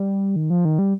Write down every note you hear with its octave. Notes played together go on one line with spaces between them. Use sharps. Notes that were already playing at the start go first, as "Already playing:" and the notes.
Already playing: G3
D#3
F3
D#3
G3